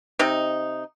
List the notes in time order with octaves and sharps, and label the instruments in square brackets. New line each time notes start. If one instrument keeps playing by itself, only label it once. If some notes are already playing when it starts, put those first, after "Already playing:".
[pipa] C3 D#4